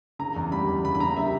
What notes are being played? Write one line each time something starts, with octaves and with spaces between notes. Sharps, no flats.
C#3 A#5
E2
G3 B5
E2
C#3 B5
B5
C#3 A#5
G3 E5